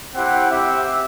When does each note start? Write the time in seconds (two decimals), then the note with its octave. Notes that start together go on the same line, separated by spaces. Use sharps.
0.15 C4 E4 G4 F#5
0.50 C4 G4 E5